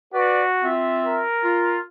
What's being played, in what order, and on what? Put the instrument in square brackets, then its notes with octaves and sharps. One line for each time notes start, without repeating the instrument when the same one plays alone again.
[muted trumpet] F#4 [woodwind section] B4 D5
[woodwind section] C4 F4 E5
[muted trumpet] A#4
[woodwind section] F4